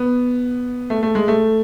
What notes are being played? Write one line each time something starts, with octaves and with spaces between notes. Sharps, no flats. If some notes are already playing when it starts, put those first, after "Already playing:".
Already playing: B3
A3
A3
G#3
A3